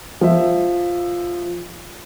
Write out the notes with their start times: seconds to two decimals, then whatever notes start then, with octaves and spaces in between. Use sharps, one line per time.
0.21 F3 E5